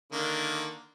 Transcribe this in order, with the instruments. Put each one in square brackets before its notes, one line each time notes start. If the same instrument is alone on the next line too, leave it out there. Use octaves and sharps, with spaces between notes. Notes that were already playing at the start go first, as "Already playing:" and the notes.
[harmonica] D3 D#3 A#3